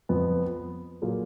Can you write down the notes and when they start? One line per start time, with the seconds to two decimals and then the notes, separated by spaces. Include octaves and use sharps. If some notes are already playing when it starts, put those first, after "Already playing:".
0.09 F2 F3 B3
1.02 A#2 F#3 A#3 F4 G#4